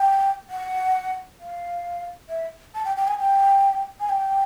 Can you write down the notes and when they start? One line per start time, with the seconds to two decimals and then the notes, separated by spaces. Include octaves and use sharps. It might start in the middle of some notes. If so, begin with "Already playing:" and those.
Already playing: G5
0.49 F#5
1.40 F5
2.29 E5
2.74 A5
2.85 G5
2.97 G5
3.08 G#5
3.19 G5
4.00 G#5
4.09 G5